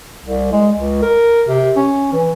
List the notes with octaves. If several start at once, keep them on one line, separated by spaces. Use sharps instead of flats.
C2
G#3
C#2
A#4
C3
C#4
E3